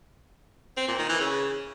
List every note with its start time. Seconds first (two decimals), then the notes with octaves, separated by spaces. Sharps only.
0.77 C4
0.88 A#2
0.99 D#3
1.09 E3
1.20 C#3